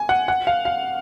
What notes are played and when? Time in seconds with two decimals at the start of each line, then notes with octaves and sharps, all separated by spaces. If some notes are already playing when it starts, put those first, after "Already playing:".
Already playing: G#5
0.09 F#5
0.28 F#5
0.47 F5
0.65 F5